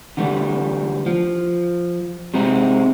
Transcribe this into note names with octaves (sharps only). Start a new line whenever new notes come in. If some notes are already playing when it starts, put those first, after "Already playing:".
D3 E3 G3 A3
F3
C3 G#3 C4 D#4 E4